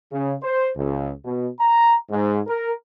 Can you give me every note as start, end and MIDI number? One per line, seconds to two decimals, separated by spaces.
0.11 0.35 49
0.42 0.70 72
0.76 1.11 37
1.24 1.49 47
1.59 1.94 82
2.10 2.40 44
2.47 2.72 70